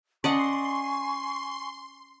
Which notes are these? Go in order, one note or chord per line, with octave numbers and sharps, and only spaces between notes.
C#4 D5 D#5 F#5 G#5 C6 C#6